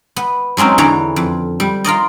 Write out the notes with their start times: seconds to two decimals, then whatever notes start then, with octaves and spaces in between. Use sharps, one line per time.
0.16 B3
0.57 F#3 G#3 C4 C#4 D#4
0.78 E2 D3 E3 C#5 D5 A#5
1.16 F2
1.60 G3
1.84 F4 A#4 D5 D#5